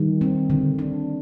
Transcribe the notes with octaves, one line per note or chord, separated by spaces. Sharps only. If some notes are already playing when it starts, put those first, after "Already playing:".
Already playing: D#3 G3
C4
D3
D4